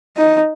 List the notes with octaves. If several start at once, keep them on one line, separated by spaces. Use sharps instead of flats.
D#4